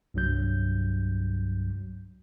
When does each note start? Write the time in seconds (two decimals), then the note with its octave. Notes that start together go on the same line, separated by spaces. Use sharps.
0.14 C2 G2 F#3 G6